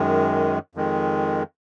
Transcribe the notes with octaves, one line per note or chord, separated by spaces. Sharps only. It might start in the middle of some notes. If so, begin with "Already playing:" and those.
Already playing: F#2 D#3 G#3
F2 D#3 G#3